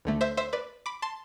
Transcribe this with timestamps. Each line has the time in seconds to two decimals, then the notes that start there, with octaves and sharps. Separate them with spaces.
0.05 D2 D3 A3
0.21 C5 E5
0.37 C5 E5
0.53 B4 D5
0.86 B5 D6
1.02 A5 C6